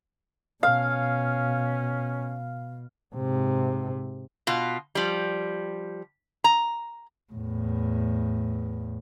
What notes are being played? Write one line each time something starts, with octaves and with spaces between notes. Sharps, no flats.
B2 C#4 F5
G#2 C3
B2 F4
F3 G3
A#5
E2 A2